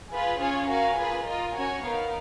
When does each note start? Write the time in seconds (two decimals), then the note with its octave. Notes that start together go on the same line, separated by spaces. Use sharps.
0.11 F4 G#4 B4
0.39 C#4 F4 G#4 C#5 F5
0.68 F#4 A#4 F5 G#5
0.97 A#3 F4 G#4 B4
1.26 F4 A#4 D#5
1.54 C#4 F#4 C#5 G#5
1.83 B3 D#4 A#4 F5